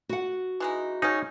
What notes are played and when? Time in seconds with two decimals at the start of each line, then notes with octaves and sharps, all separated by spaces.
0.09 F#4 F#5
0.60 E3 G#3 D#4
1.02 C#3 F#3 C#4 D#4